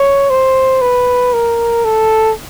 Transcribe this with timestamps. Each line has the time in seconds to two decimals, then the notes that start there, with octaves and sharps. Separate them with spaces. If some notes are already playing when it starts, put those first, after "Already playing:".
Already playing: C#5
0.30 C5
0.81 B4
1.33 A#4
1.85 A4